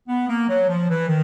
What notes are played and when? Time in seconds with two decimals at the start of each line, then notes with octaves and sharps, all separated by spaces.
0.08 B3
0.27 A#3
0.47 F#3
0.68 F3
0.88 E3
1.07 D#3